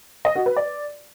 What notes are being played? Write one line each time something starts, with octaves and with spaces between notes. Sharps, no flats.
D#5
F#4
B4
D5